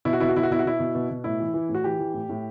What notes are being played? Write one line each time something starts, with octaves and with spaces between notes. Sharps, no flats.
B2 E4
F#4
B2 E4
F#4
B2 E4
F#4
B2 E4
F#4
B2 E4
B2
B2
B2
A2 E4
E3
E3
A2
F#4
E3 G4
E3
A2
A2